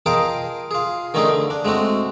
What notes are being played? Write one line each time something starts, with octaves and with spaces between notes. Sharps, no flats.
F4 G#4 A#4 D#5 G5 A5
F4 G#4
D3 D#3 A3 C#4 D#4 G#4
D3
D4
G#3 A3 C4 F#4